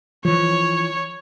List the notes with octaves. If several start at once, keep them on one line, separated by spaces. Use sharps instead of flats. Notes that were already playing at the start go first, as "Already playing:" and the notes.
E3 F3 C#5